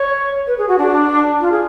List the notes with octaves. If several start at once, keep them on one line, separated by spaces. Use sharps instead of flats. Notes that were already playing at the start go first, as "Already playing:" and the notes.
Already playing: C#5
B4
G#4
F#4
D4
F4
G#4